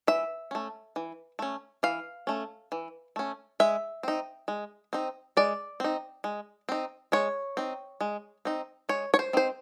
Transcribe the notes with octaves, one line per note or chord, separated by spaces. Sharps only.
E3 E5
A3 C#4
E3
A3 C#4
E3 F5
A3 C#4
E3
A3 C#4
G#3 E5
C4 D#4
G#3
C4 D#4
G#3 D5
C4 D#4
G#3
C4 D#4
G#3 C#5
C4 D#4
G#3
C4 D#4
G#3 C#5
C#5
C5
C4 D#4 C5